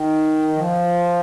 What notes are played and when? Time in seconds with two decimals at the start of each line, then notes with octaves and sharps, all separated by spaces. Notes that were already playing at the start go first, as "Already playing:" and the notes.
Already playing: D#3
0.56 F3